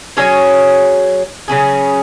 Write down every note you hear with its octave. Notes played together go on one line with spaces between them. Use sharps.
F#3 C#4 G#4 C#5
C#3 F#3 C#4 G#4